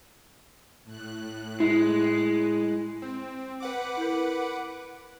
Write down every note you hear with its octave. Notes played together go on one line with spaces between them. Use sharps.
A2 F#6
G#3 E4
C4
B4 F#5 D6
E4 A#4